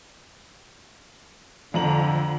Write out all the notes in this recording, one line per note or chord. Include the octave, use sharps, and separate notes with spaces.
F2 D3 A#5 F#7